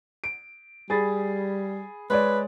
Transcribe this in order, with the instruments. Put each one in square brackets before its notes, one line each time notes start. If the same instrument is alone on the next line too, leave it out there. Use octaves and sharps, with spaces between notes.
[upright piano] D7
[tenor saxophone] G3 [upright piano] G#4 B5 A6
[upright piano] G#3 C#5 D5 [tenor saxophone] B4